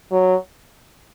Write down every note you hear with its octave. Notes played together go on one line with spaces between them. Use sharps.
F#3